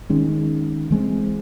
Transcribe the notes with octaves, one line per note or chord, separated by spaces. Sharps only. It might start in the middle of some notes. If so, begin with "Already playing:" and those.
D#3 G#3 C#4
E3 G#3 C4